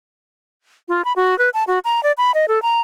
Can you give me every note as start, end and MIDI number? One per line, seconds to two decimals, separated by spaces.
0.88 1.05 65
1.05 1.13 83
1.16 1.37 66
1.39 1.49 71
1.54 1.64 81
1.67 1.79 66
1.85 2.03 82
2.03 2.12 74
2.18 2.32 83
2.34 2.46 75
2.48 2.61 69
2.62 2.81 82